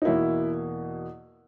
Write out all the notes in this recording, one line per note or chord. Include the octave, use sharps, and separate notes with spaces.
D#4
E2 B2 A#3 E4